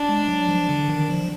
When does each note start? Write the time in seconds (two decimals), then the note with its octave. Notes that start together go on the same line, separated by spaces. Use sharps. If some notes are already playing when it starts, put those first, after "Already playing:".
Already playing: D4
0.09 G#3
0.29 F#3
0.49 F3
0.69 D3
0.90 D#3
1.10 F3